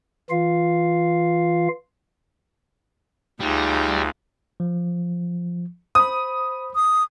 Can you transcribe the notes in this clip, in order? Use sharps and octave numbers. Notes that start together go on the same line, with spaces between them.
E3 F4 F5
D2 G3 D#4 F4 G#4
F3
C5 B5 D#6
D#6